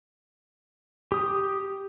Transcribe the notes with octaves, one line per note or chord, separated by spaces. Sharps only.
G4 D#6